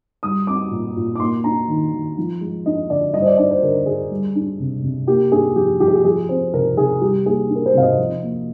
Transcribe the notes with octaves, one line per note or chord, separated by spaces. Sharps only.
G3 D#6
C4 D6
A#2
A#2
D6
A#3 C6
D4 A#5
D#3
D#3
F3
G#3
D4 D#5
D3 D5
G3 D#5
C5
D5
D4 D5
C5
D3 A#4
D3 G#4
G3
D4
C3
C3
A#3 G4
D4 G#4
F3 G4
F3 G4
G#4
G4
F3 G#4
C4 C5
C3 A#4
C3 G#4
G3 G4
A#3 G#4
D4
A#4
C5
C3 F5
D#5
F3
A#3